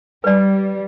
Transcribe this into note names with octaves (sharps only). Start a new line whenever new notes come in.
G3 B4 D5